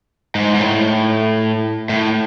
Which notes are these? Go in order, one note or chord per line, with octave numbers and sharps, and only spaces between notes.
G#2
G#2
A2
A2